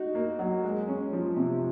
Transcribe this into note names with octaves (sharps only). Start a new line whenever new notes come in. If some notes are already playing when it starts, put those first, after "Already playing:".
Already playing: D#4 F#4
A#3
F#3
G#3
C#4
F3
C3